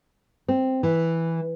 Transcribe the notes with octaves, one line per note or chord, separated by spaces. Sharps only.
C4
E3